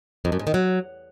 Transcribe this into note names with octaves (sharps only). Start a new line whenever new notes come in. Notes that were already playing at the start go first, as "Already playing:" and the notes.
F2
F#2
G#2
D#3
F#3